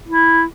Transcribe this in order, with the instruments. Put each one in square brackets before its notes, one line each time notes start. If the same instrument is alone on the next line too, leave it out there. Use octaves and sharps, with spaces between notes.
[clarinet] E4